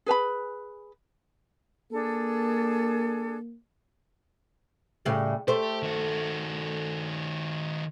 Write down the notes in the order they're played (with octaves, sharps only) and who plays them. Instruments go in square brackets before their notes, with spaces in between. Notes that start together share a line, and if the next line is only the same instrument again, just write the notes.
[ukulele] G#4 B4 A5 B5
[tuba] A#3 [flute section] D4 G#4 A4
[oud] A2 C#3 G3
[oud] A3 C5 [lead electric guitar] G4
[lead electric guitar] D#3 F#4